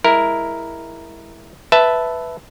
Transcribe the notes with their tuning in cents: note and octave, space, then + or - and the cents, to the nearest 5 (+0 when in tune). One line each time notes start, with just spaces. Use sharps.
G#3 +0 E4 +0 A#4 +0
B4 +5 E5 +0 A5 +0